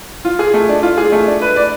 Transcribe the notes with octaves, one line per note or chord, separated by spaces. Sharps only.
F4
G#4
A3
D4
F4
G#4
A3
D4
B4
D5